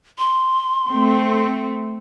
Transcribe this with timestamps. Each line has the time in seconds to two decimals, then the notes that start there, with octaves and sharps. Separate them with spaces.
0.18 C6
0.89 A3 C4